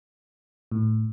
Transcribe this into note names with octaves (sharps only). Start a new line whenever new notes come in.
A2